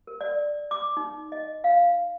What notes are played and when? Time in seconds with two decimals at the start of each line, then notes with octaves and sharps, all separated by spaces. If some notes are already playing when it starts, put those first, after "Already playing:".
0.07 A#4
0.21 D5
0.71 D6
0.97 D#4
1.32 D#5
1.64 F5